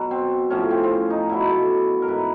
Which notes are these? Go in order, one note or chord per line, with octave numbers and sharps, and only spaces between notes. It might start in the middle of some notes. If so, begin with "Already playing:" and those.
Already playing: B2 F#3
C4
A2 F3 C#4
C4
C4
C#4
D#4
B2 F#3 E4
A4
A#4
G#2 E3 B4